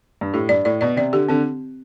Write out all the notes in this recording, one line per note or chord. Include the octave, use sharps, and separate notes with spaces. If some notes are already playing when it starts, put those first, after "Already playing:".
G2
A2 G4
G2 D5
A2 D5
B2 D5
C3 D5
D3 G4
D3 C4